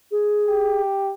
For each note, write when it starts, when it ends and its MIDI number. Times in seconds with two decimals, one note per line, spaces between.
0.11 0.82 68
0.48 1.13 67